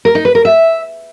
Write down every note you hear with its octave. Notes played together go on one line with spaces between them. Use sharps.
A#4
D#4
B4
A#4
E5